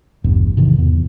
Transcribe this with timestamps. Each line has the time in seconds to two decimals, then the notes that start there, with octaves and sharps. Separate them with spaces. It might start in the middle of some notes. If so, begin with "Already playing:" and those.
0.24 A1 E2 G2 B2
0.57 G#2 C3 D#3 E3
0.79 E2